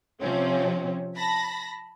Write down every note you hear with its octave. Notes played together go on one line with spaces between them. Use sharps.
C3 F3 C4 C#4
A5 B5 A#6